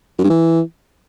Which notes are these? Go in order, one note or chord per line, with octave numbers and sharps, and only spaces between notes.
F#2
G2
E3